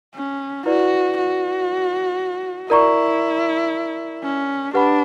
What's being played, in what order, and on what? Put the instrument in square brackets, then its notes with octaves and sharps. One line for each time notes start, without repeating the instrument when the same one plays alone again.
[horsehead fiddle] C#4
[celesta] E4 B4 D5 [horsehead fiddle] F#4
[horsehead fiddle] F#4
[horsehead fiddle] E4 [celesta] A#4 D5 A#5 C#6
[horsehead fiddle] C#4
[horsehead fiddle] D4 [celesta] G4 B4 F#5 B5